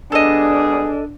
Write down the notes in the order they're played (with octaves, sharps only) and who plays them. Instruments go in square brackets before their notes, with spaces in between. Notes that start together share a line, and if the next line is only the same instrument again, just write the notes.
[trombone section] G3 B3 G#4 [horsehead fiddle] D4 [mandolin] A4 D#5